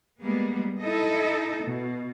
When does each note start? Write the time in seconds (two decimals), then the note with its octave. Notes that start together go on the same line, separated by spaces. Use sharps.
0.21 G3 G#3 A#3 B3
0.79 D#4 E4 A4 D#5
1.62 B2